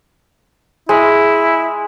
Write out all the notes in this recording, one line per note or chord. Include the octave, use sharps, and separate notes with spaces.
G#3 E4